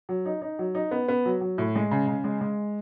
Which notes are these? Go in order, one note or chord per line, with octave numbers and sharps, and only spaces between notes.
F#3
D#4
D#4
F#3
D#4
B3
B3
F#3
F#3
A2
G#3
C#3
C#3
G#3
G#3